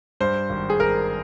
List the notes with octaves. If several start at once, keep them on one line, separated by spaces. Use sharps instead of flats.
G2 C5
G#1
G#4
G#1 A#4